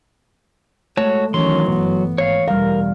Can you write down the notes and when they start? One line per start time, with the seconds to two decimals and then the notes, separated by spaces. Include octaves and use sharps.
0.97 G#3 A3 F#4 C#5 A5
1.34 D#3 E3 F#3 C#4 C6
1.70 G1 B3
2.18 G#1 C#5 F5
2.48 E2 B2 G3 A#4 F5